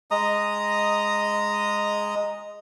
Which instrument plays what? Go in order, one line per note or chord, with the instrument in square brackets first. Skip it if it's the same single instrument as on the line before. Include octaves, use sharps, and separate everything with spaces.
[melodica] G#3 D#5 A#5 D#6